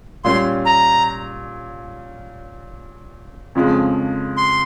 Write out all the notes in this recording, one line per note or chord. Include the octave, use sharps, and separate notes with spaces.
A#2 G3 C#4 C6
A#5
F2 C#3 F3 G#3
C6